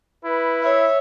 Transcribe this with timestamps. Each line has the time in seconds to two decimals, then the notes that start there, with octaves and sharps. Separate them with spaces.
0.25 E4 B4
0.63 C#5 E5